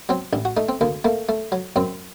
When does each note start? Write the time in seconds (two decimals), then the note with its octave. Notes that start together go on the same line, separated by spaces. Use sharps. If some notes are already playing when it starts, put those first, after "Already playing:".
0.09 F#3 C4
0.33 A1 D4
0.45 F#4
0.57 A3 D#4
0.69 C4
0.81 D2 A#3
1.04 A3 A#3
1.29 A3
1.52 F#3
1.76 F#2 C4